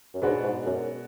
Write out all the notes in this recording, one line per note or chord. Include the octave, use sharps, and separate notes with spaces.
F#2
G#2 B2 G#3 B3 D4 F#4
G#2
F#2